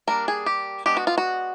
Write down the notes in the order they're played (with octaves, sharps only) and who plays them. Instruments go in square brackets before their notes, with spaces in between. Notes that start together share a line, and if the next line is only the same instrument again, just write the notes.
[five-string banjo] G3 A#3 D4 A#4
G#4
G4
G#3 B3 D4 G4
F#4
F4
F#4